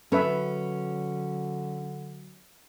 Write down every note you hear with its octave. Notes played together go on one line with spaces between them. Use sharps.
D3 F#3 C#4 A4 B4 E5